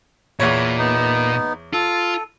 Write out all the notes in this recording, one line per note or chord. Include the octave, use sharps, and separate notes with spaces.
E2 A#2 C#5 B5
B3 D#4
F4 A4